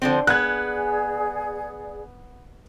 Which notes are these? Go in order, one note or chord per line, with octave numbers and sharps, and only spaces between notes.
D3 F3 C4 C5
B3 G#4 D5 F#6 G#6